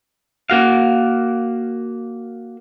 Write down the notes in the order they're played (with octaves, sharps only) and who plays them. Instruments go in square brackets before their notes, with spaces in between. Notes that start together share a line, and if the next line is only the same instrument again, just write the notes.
[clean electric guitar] A#3 F#4 F5